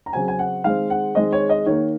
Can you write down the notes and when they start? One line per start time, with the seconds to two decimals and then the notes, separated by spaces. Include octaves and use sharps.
0.06 A#5
0.13 C#3 F#3 C4 G#5
0.28 G#5
0.39 F#5
0.64 D#3 G#3 C4 F5
0.90 F#5
1.15 D#3 G#3 C4 D#5
1.32 C#5
1.49 D#5
1.66 D#3 A#3 C#5